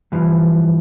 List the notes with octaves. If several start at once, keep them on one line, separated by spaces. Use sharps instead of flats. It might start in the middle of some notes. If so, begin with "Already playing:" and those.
G2 E3 F3